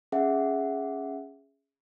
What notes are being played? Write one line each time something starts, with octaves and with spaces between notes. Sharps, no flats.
C#4 G#4 E5 F#5